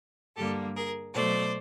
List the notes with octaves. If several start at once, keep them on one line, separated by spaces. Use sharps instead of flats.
G2 D3 G3 A#3 G4 A4
G#4 A#4
B2 F#3 A3 C5 D5